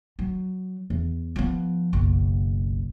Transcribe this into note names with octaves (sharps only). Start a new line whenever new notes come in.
F#3
E2
F3 B3
F#1 B1